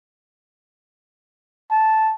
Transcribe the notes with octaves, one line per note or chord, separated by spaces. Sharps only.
A5